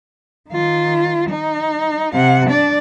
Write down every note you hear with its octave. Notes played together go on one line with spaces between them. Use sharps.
D#3 F4
D#4
C3 F#5
D4 D5